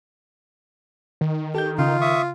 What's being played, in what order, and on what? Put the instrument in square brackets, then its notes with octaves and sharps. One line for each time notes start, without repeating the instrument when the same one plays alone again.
[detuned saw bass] D#3
[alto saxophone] G4 [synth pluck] A4 G6
[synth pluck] C#3 [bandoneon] D#4 [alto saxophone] F4
[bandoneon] E5 C#6 D#6